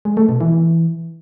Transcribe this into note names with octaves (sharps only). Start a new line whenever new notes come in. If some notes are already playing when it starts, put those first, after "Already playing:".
G#3
A3
B2
E3